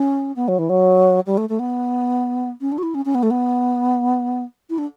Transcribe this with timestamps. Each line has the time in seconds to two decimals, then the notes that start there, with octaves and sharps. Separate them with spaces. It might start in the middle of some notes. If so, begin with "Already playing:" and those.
Already playing: C#4
0.36 B3
0.48 F#3
0.59 E3
0.69 F#3
1.26 G3
1.37 A3
1.49 A3
1.59 B3
2.61 C#4
2.72 D4
2.78 F#4
2.83 E4
2.95 C#4
3.05 C#4
3.15 B3
3.23 A3
3.31 B3
4.70 E4
4.78 D4